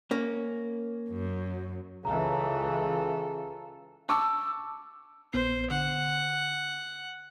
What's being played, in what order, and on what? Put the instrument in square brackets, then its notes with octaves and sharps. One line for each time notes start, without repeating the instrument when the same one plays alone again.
[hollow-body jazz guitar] A#3 C#4
[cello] F#2
[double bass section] C#2 E3 [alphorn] C#3 [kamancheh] F4 A4 [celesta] A#5
[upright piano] A5 C#6 D6 [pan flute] E6
[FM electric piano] A#1 B3 C7 [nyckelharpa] C5
[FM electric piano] D3 [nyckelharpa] F#5